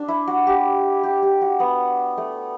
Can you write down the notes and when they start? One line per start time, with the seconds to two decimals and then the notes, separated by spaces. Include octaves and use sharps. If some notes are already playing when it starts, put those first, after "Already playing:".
Already playing: D4
0.08 E4
0.27 F#4
0.47 G4
1.03 G4
1.22 G4
1.41 F#4
1.60 B3
2.18 A3